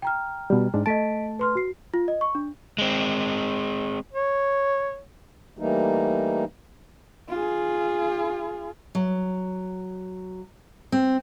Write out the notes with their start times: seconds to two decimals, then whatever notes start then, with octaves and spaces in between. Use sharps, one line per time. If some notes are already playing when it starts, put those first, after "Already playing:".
0.02 G5 A#5 F6
0.50 B2 G3
0.74 G#2 G#3 D4
0.86 A3 D#5 A5 B6 D7
1.39 B4 C6 F6
1.55 F#4 C7
1.94 F4
2.08 D#5
2.21 C#6
2.35 D4
2.78 G#3 C4
4.13 C#5
5.58 E3 G3 A3 A#3 D#4
7.29 F4 G#4
8.95 F#3
10.92 C4